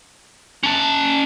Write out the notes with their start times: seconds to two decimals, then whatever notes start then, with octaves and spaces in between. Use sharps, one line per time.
0.63 C#4 A5